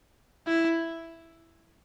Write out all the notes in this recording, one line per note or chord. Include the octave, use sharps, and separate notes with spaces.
E4